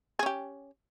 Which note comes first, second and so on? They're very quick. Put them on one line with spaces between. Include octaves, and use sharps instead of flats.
G#4 C#4 G4